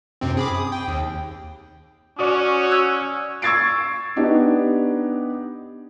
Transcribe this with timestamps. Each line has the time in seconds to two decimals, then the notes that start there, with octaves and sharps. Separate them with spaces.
0.21 F#2 C3 C4
0.37 G#4 B5 D6
0.54 D#6
0.72 G5
0.88 D#2
2.19 C#4 F#4 D5 D#6
2.72 E6 F#6 G#6
3.42 C#6 E6 G#6 A6 C7 D7
4.16 B3 D4 D#4 G4